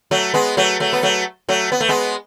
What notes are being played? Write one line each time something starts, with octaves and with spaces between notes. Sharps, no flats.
F#3 A3
G#3 B3
F#3 A3
F#3 A3
B3
F#3 A3
F#3 A3
B3
A3
G#3 B3